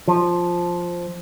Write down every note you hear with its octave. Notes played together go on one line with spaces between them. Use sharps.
F3